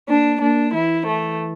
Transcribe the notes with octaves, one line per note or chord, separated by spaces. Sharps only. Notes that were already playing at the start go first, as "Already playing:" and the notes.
A#3 D4
A#3 D4
E3 E4
A3